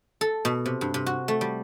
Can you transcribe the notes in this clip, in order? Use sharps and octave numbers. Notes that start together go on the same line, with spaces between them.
A4
B2
C3
G2
C3
F#4
A3
G3